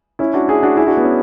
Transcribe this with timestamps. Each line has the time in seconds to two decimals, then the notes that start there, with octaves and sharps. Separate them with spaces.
0.19 C#4 E4
0.34 D4 F#4
0.49 E4 G#4
0.63 D4 F#4
0.77 E4 G#4
0.87 D4 F#4
0.97 B3
1.05 C#4